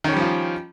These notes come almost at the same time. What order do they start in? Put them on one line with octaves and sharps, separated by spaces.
D#3 C#4 G3 F3 F4